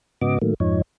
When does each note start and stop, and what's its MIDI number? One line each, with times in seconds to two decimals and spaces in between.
0.21 0.38 44
0.21 0.38 49
0.21 0.38 59
0.21 0.38 66
0.21 0.38 75
0.21 0.38 86
0.41 0.54 45
0.41 0.54 51
0.41 0.54 54
0.41 0.54 57
0.41 0.54 58
0.60 0.82 41
0.60 0.82 44
0.60 0.82 53
0.60 0.82 63
0.60 0.82 73